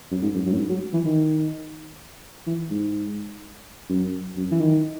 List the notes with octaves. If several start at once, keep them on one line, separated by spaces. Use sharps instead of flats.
F#2
G#2
F#2
F#2
A2
G#2
F#3
E3
D#3
E3
G#2
F#2
F#2
E3
D#3